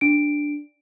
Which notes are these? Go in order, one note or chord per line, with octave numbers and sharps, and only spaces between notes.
D4 D7